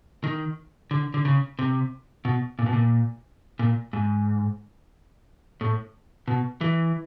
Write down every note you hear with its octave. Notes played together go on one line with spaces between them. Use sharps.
D#3
D3
D3
C#3
C3
B2
A#2
B2
A#2
A#2
G#2
A2
B2
E3